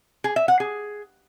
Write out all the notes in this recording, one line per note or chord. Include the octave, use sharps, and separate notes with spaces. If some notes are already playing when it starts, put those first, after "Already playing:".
G#4
E5
F#5
G#4